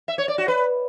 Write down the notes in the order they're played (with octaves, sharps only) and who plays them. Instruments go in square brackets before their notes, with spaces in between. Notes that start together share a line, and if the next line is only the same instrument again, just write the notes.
[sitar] E5
C#5
D5
F#4
B4